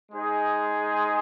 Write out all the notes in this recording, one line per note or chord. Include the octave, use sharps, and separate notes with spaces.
G#3 D#4 G#4 C5